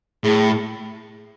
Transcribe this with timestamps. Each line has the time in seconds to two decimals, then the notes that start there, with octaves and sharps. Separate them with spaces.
0.24 A2 G#4